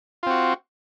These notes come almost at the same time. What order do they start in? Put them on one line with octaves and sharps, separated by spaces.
F4 C4 F#4